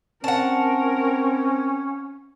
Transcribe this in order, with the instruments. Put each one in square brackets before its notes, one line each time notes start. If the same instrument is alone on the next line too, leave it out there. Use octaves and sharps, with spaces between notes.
[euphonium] C4 [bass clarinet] C#4 [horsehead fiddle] A#4 [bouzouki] F#5 A5